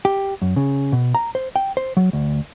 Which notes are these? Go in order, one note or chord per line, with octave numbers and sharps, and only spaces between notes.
G4
F#2
C#3
B2
A#5
C5
G5
C5
F#3
D2